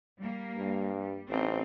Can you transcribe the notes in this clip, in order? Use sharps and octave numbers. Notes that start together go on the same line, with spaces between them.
G3 A#3
G2
G3
A1 C4 D#4